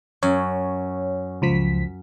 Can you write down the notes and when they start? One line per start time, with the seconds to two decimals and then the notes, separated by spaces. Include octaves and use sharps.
0.23 F#2 C#5
1.42 C#2 F3 B6